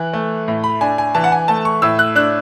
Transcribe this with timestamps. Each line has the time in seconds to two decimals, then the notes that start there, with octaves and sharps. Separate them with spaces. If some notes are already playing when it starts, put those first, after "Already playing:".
Already playing: E3 F#6
0.13 A3
0.48 A2
0.64 B5
0.81 D4 G#5
0.98 G#5
1.15 E3 A5
1.24 F#5
1.32 G#5
1.48 A3 A5
1.65 C#6
1.82 A2 E6
1.99 F#6
2.15 D4 F#6